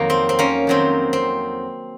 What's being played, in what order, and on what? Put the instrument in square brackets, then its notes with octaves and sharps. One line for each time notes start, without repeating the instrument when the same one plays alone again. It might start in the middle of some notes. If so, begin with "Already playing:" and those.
Already playing: [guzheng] F2 D#3 F#3 A#3
C4
C4
A#3 C#4
F2 D#3 F#3 C4
C4